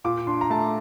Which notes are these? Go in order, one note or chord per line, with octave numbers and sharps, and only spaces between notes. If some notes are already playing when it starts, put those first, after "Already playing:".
A#2 D6
D4 C6
A#5
A3 A5